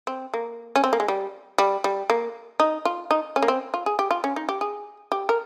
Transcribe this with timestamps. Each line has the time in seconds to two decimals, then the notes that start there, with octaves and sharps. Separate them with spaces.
0.07 C4
0.34 A#3
0.76 C#4
0.84 C4
0.93 A#3
1.00 G#3
1.08 G3
1.58 G3
1.84 G3
2.10 A#3
2.60 D#4
2.85 F4
3.11 D#4
3.36 C#4
3.42 A#3
3.48 C4
3.74 F4
3.86 G#4
3.99 G4
4.11 F4
4.24 C#4
4.36 D#4
4.49 G4
4.61 G#4
5.12 G4
5.29 A#4